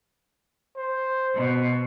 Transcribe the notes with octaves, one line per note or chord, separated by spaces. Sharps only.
C5
B2